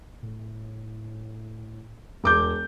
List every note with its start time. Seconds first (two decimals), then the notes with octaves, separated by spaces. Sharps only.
0.23 A2
2.24 E1 D6 G6